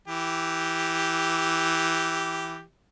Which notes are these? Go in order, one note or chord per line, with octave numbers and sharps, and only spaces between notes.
E3 G4